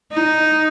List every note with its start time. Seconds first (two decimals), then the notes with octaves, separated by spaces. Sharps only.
0.13 D#4